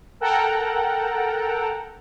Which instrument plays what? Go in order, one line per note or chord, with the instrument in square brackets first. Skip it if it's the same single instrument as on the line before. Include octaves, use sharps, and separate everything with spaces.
[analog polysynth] A4 A#4 F#5 G5 A5 A#5